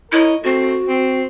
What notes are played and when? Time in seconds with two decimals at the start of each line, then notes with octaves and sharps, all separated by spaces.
0.12 E4 A#4 C#5 D#5
0.44 A3 C4 F#4
0.87 C4